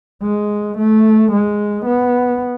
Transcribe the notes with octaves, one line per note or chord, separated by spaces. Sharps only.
G#3
A3
G#3
B3